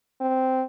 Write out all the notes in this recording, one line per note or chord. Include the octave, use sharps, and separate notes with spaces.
C4